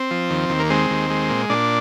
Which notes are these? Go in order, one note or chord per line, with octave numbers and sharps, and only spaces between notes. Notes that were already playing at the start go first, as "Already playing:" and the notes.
Already playing: C4
F3
D#2
D#2
A#3
G#3 C4
D#2
G#3
A#2
A#2 D4